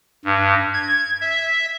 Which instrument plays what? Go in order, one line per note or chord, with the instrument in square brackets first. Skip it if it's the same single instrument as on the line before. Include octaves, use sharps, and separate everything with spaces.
[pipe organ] G2
G#6
E5